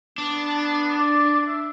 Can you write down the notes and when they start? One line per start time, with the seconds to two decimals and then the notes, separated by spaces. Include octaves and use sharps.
0.18 B3 D4
0.97 D5
1.47 E5